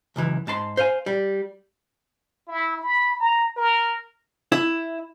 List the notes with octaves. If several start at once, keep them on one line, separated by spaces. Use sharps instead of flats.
C#2 F#2 E3
G#2 A5 C6
C5 F5 G#5
G3
E4
B5
A#5
A#4
E4